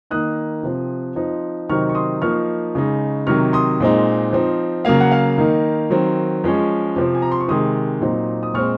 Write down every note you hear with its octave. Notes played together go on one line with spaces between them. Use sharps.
D#3 A#3 D#4 D#6 F#6
C3 F3 C4
F3 C4 D#4
C3 D#3 F#3 C4 D#4 C#6 F6
C#6
C6 D#6
F3 A#3 D#4 C#6 F6
C#3 G#3 D#4
C3 D#3 F#3 C#6 F6
C6 D#6
A#2 G#3 C4 D#4
F3 C4 D#4
C#3 F#3 A#3 F5
F#5
F5
D#3 A#3 D#4
D#3 F#3 C4
F3 G#3 C#4
C3 F3 C4
G#5
A#5
C6
C#6
C3 D#3 G#3 C6 D#6
A#2 F#3 C4 D#4
D#6
A#2 G#3 C4 C#6 F6